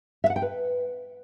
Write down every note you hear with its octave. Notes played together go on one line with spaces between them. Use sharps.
E5
F#5
G5
B4